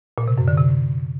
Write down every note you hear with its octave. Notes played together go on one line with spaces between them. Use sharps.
A#2
C3
F#2
D3
C3